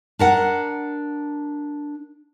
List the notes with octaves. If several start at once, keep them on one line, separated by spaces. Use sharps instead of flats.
D4 A#4 F#5